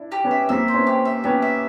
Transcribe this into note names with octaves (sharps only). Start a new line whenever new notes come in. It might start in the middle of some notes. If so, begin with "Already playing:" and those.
Already playing: D4 E4
G4
B3 C#4
E5
A#3 C4 E5
C5
B3 C#4
G4
E5
B3 C#4 G4
E5